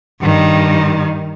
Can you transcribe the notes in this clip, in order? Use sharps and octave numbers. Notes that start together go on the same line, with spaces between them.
G2 D#3